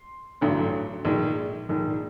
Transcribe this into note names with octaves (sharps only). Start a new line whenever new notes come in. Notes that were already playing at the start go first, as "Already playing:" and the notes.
Already playing: C6
A1 G2 D3 F#3 A3
A#1 G#2 D#3 G#3
A#1 G#2 D#3 G#3